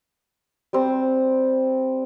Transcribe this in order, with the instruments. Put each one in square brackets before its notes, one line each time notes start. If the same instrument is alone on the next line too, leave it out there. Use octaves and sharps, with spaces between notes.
[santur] G3 C4